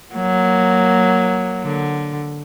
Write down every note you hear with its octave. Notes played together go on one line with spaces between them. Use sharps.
F#3 A#3
D3